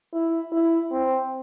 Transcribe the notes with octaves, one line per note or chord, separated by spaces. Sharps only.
E4
E4
C4